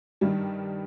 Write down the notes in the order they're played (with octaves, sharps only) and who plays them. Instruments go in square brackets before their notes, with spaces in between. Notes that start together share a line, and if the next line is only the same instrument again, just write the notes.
[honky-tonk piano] G2 D#3 G3